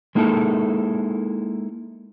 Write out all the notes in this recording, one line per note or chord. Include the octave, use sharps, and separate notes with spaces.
G#3 A#3 D#4 E4 A4